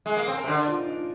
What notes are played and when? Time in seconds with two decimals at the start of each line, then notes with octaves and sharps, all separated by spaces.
0.06 G#3
0.17 A#3
0.28 C4 G#4
0.38 A#4
0.44 C3
0.48 D3 C5
0.58 D5
0.68 F4
0.78 D#4
0.89 D4
0.98 F4